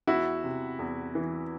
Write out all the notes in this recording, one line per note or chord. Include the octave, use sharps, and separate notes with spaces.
E2 E4 F#4
C3
E2
E3